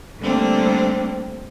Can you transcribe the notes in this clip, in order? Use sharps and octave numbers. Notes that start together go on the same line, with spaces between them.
D3 G3 A3 A#3 C4 D4